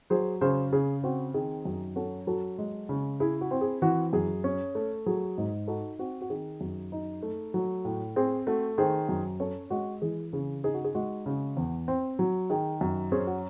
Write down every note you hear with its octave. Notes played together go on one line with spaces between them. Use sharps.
F#3 G#4 C5
C#3 G#4 C5
C#3 G#4
C4 F#4
D#3 G#4
F#2
C#4 F#4 A4
F#3 F#4 A4
G#3
C#3
E4 G#4
F#4
C4
G#4
E3 F#4
F#2 G#4
C#4
A3
F#3 G#4
G#2
D#4 F#4 A4
C4 F#4
F#4
D#3 G#4
F#2
D#4
A3
F#3
A2
C4 G#4
A3 F#4
D#3 G#4 C5
F#2
C#4 A4 C#5
G#3 F#4
E3 G#4
C#3 G#4
D#4 G#4
F#4
G#4
G#3 F#4
C#3
E2
C4
F#3
D#3 G#4
F#2
C#4 G#4 C5
F#4